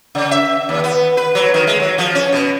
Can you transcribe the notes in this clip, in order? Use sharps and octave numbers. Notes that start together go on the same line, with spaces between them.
C#3
E5
D#2
B3
B4
F#3
D#3
G#3
F#3
F3
C#4
B2